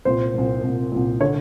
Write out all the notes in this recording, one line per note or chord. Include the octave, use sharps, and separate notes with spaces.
C2 A#2 C5
C2 A#2
C2 A#2
C2 A#2
D3 C#5